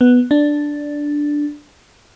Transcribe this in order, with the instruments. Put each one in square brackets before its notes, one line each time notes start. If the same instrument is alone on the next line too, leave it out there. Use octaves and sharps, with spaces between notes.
[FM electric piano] B3
D4